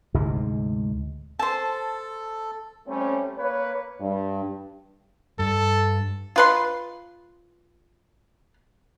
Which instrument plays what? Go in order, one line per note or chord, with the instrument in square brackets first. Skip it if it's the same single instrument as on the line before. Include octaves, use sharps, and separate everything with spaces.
[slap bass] D2 G#2 C3 G#3
[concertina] A4 [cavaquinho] C5 A5
[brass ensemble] G3 A3 C4 C#4
A#3 B4 C#5
[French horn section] G2
[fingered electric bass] G2 [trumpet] A4
[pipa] F4 B4 C6